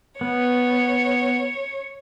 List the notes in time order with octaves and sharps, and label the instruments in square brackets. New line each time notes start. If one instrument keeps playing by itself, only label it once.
[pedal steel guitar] B3 [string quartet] C#5